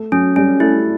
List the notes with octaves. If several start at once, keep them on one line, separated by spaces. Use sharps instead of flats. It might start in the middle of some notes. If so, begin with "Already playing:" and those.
Already playing: A3
F#3 C#4
G3 C#4
A3 E4